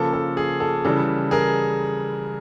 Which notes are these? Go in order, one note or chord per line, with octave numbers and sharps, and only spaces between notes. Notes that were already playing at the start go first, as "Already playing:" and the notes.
Already playing: C#3 F3 A#3 A4
A4
G#4
A4
C#3 E3 G3 A4
G#4 A#4